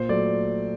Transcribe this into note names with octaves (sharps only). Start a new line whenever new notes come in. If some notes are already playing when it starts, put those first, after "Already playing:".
Already playing: A#2 C5
F#3 A3 D5